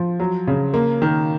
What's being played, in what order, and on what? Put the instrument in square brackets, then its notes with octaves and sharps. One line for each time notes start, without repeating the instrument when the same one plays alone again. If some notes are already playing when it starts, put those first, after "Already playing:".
Already playing: [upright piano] F3
F#3
C#3
A#3
D#3